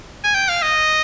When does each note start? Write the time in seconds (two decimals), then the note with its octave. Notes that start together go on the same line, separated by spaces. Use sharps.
0.24 G#5
0.35 G5
0.49 F5
0.62 D#5